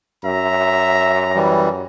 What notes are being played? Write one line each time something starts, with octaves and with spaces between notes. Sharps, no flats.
F#2 E5 A#5
E3 G3